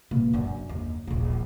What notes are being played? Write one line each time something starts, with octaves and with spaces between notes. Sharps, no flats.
B2 A#3
F#2 D4
D#2
D#1 A#1